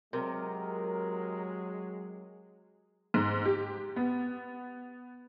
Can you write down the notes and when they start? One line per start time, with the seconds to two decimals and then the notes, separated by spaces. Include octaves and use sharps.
0.13 C3 F#3 G#3 A#4
3.14 G#2
3.45 G4
3.96 B3